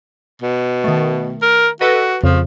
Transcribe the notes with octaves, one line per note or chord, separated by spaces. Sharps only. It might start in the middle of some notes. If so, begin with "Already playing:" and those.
B2
D#3 A3
A#4
F#4 A4 B4 D#5
F2 C#3 F3